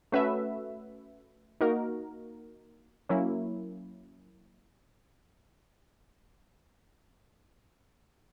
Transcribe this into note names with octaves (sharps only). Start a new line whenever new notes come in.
A3 C#4 F#4 B4 E5
A#3 D#4 F#4 A#4
F#3 A#3 C#4 E4